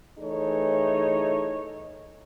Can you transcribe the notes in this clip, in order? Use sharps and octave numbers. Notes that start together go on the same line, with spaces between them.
E3 A3 D#4 G#4 A4 C#5